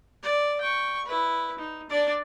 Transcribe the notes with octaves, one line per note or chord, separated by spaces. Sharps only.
D5
G5 C#6
E4 B4
D#4
D4 D5